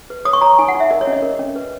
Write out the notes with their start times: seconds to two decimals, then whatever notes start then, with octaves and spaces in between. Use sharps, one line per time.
0.10 B4
0.25 C#5 D#6
0.33 C#6
0.41 C#5 A#5
0.58 D#4 G#5
0.68 F#5
0.75 D#4
0.80 E5
0.91 A#4 D#5
1.01 C#5
1.07 C#4
1.13 D#5
1.23 A#4
1.39 C#4
1.56 B4